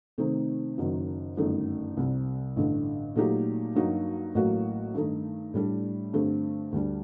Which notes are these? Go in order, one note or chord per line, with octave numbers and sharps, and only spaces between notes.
C3 D#3 A3 C4 D#4
F#1 F#2 D#3 F#3
G1 F#2 D#3 A3 D#4
C2 C3 G3
A1 G2 D3
A#2 F#3 A3 D#4 G4
G2 F#3 A#3 D#4 F#4
A1 A2 F#3 A#3 F#4
G2 D#3 A3 D#4 A4
A2 G3 D4 A4
G2 D3 A3 C4 G4
D2 D3 G3 D4